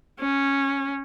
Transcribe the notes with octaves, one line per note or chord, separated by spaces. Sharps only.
C#4